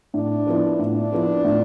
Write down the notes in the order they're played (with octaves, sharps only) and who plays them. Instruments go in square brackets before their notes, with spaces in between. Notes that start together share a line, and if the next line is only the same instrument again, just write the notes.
[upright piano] A2 [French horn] D4
[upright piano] F3 B3 E4
[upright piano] A2 [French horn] D4
[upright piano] F3 B3 E4
A2